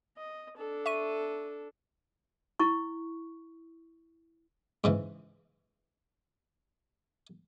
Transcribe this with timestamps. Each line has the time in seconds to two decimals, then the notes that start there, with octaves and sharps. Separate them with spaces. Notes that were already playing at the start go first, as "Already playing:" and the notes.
0.17 D#5
0.57 D4 A4
0.86 E5 C#6 D#7
2.60 E4 C#6
4.84 G#2 C#3 E3